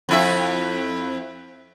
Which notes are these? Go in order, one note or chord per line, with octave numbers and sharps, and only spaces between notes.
F2 E4 E5